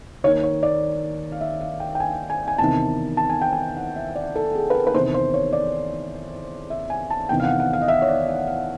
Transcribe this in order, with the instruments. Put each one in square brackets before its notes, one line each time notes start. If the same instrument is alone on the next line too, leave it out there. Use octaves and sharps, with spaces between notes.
[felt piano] D#2 D#3 C#5
C#5
D5
F5
E5
F5
G5
G5
G#5
G#5
G#5
E2 C3 D#3 A5
A5
G#5
G5
G#5
F#5
E5
D5
A4
G#4
B4
A#4
B4
E2 C3 D#3 C5
C5
C#5
D5
E5
G#5
A5
E2 C3 D#3 G5
F5
F#5
F#5
F5
D#5
E5
C#5
D5
E5
F5